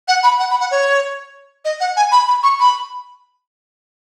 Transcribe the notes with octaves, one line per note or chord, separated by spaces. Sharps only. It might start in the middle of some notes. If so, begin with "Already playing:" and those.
F#5
B5
F#5
B5
F#5
C#5
D#5
F#5
G#5
B5
B5
C#6
B5